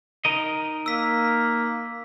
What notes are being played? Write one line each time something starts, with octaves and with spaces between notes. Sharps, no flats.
D#4 A#4 D#5
A#3 E6 B6